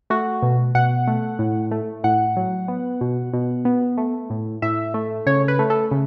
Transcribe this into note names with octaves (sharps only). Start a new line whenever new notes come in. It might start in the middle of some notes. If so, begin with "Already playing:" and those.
A3 F#4
B2
B2 F#5
A3
A2
A3
A2 F#5
F#3
B3
B2
B2
B3
A3
A2
A2 E5
A3
C#3 C#5
B4
A3
A4
C#3